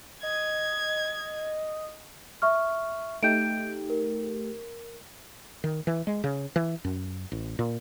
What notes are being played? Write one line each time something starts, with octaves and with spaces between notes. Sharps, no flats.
D#5 G#6
E5 C#6 F6
A3 D#4 G4 G6 D7
A#4
D#3
E3
G#3
C#3
E3
F#2
A1
A#2